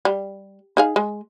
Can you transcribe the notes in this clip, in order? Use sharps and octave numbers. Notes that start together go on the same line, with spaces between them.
G3
D#4 G#4 F5
G#3